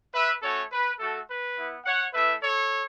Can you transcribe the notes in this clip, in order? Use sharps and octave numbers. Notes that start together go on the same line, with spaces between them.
B4 E5
A3 C#4 F#4 A4 C#5
B4
A3 F#4 A4
B4
B3 E4
C#5 F#5
A3 E4 B4 E5
A4 C#5